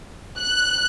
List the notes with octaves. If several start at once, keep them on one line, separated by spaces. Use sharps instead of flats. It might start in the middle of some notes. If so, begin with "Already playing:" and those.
F#6